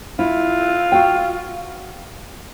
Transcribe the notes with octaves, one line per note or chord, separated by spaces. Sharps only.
E4 F4
F#4 F5 G5